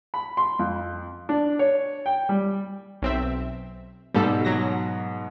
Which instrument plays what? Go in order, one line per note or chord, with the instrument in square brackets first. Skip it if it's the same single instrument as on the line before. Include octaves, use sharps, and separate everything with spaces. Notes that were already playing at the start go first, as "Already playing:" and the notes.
[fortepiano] B5
C6
F2
D4
C#5
G5
G3
[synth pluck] B1 C4 E5
[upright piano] G#2 B2 [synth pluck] G3 A4
[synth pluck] F#3 A#6